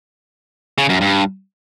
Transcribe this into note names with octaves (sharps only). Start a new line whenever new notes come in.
C#3
F#2
G2